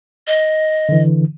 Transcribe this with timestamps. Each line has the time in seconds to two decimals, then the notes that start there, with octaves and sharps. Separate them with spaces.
0.27 D#5
0.89 D3 E3